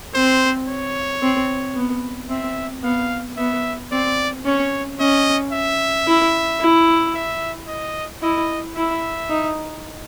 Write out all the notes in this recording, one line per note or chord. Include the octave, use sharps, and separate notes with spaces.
C4 C5
C#5
C4
B3
C4 E5
B3 F5
B3 E5
C4 D5
C#4 C#5
C#4 D#5
E5
E4
E4
E5
D#5
E4 D#5
E4 E5
D#4